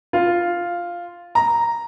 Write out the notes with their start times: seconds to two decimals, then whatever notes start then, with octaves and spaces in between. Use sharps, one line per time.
0.13 F4
1.35 A#5